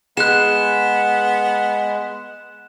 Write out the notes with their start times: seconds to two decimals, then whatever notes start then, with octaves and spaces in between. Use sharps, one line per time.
0.17 G#3 B3 G#4 F#6 E7